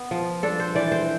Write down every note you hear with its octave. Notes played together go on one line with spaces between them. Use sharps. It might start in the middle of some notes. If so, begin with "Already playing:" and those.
Already playing: B3
F3
D4 A4
C5
E3 D5
C5